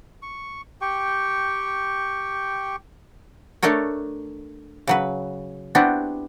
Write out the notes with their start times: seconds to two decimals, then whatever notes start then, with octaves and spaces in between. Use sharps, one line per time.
0.22 C#6
0.81 G4 G5 C#6
3.63 A3 D4 A4 A#4 C#5
4.87 C#3 F#3 B4
5.75 B3 C4 D4 E4 F#4 G4